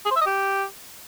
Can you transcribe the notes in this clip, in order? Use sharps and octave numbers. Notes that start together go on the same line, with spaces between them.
G#4
C5
E5
D#5
G4